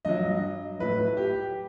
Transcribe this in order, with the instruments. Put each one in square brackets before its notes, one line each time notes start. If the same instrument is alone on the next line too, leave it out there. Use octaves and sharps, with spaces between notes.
[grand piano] G2 F#3 D#5
A2 F#3 B4
G4